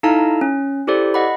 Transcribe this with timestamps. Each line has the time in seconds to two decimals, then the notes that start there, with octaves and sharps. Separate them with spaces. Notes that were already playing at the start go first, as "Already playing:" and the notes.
0.03 D#4 E4 A4 F5 A5 A#5
0.41 C#4
0.87 E4 G4 A4 C5 D5
1.14 D#5 F#5 B5